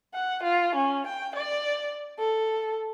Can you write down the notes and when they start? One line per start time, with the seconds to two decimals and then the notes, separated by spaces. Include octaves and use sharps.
0.14 F#5
0.43 F4
0.75 C#4
1.07 G5
1.36 D5
2.19 A4